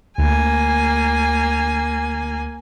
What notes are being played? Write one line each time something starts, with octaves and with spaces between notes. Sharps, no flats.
D2 A#3 G#5